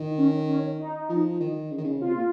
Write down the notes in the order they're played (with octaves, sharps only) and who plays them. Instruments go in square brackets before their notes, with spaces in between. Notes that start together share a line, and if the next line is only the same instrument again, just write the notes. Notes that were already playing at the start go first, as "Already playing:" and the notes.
Already playing: [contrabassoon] D#3
[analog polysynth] C#4
C#4
D#4
[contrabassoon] F3
D#3
C#3
D#3
C#3
[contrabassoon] C3 [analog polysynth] F4
[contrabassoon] A#2